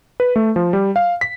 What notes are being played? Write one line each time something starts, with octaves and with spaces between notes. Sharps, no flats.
B4
A3
F3
G3
F5
B6